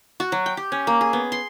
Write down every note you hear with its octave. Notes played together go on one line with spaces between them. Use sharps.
F#4
F#3
G5
G4
C#4
A#3
G#4
B3
C6